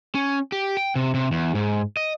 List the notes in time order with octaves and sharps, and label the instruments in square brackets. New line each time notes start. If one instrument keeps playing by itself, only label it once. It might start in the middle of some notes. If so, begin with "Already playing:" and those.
[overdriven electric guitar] C#4
G4
G5
C3
C3
E2
G#2
D#5